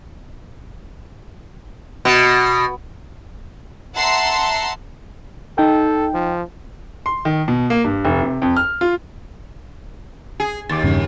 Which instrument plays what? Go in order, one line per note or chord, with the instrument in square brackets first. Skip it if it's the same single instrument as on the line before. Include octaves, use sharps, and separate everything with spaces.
[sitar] B2
[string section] E5 F#5 A5 A#5 C6
[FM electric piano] D#4 G5 [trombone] A4
[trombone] F3
[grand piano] C6
D#3
B2
A#3
G2
F1
C3
F2
F6
F4
[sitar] G#4
[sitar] D#2 [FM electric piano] D6 A6
[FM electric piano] E2 G2 C#3